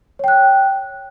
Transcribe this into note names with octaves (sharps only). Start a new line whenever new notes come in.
C#5 G5 F#6